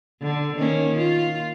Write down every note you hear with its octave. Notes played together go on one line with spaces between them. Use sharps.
D3
D#3 A#3 C#4
F4